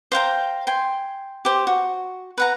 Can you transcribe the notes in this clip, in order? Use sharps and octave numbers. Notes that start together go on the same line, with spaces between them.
C5 F5 G5 A#5
G5 G#5 C6
G4 C5
F#4
B4 F#5 A#5